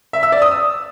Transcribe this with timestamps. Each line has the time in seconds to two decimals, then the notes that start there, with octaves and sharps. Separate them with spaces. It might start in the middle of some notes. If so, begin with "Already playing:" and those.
0.13 E5
0.23 E6
0.32 D5
0.42 D#6
0.51 E6